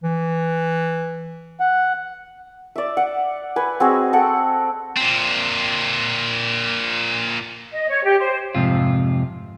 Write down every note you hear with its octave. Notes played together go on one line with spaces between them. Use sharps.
E3
F#5
D5 E5
F#5
B4 G#5
C4 F#4 G#4 D#5
A4 F#5 G5
A#2 C4
D#5
C#5
G4
C5
F2 G#2 C3 F4